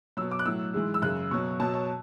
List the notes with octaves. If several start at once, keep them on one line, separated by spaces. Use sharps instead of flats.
B2 F#3 E6
D6
F#6
A2 F#3 E6
G#2 E3 G#3
E6
F#2 C#3 G#3 F#6
B2 F#3 C#6
B2 F#3 A5
C#5